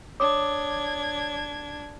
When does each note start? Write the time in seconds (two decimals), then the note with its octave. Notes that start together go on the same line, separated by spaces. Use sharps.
0.20 D4 C#5 D6 D#6 G#6